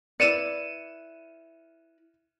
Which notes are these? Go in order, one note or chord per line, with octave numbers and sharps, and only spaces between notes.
E4 B4 D5 C#7 D#7 E7